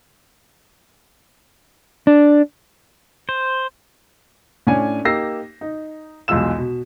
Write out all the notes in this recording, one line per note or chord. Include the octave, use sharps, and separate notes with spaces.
D4
C5
A2 C#4 D4 G#5
A#3 D#4 G4 E6 A#6 C7
D#4
B1 E2 G#3 F4 E6 E7
B2